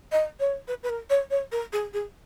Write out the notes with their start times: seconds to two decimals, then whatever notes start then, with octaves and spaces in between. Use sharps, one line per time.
0.12 D#5
0.40 C#5
0.68 B4
0.83 B4
0.89 A#4
1.10 C#5
1.30 C#5
1.52 A#4
1.72 G#4
1.93 G#4